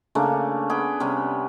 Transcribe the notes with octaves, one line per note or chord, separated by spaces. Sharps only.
C#3 A3 A#3 D4
B3 G#4 G5
C3 G3 B3 C#4